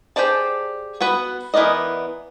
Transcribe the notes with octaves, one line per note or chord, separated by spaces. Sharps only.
G4 G#4 C5 D5 A5
B3 F#4 B4
E3 B3 A#4 D5 D#5